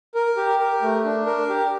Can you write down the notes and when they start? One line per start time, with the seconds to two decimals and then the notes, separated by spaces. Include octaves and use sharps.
0.15 A#4
0.37 G4
0.59 A#4
0.82 A3
1.04 D4
1.26 A#4
1.49 G4